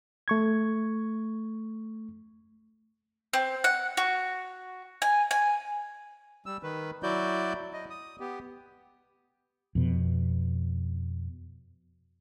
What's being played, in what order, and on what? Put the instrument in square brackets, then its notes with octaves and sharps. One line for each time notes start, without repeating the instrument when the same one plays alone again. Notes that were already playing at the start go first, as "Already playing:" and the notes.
[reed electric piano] A3 C#6 G#6
[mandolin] C4
F#5
F#4
G#5
G#5
[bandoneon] G3 E6
D#3 B4
F#3 E4 F#4 D5 G6
D#5
D#6
B3 G4
[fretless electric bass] F2 B2